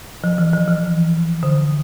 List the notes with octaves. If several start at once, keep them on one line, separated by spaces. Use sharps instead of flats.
F3
E3
F3
E3
D3